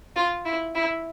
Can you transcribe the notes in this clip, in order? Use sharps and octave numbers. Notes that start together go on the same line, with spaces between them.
F4
E4
E4